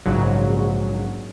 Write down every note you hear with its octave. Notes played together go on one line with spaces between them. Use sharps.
A#1 G#2 C#3 F#3